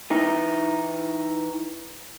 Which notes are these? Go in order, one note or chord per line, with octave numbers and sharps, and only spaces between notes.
E3 D#4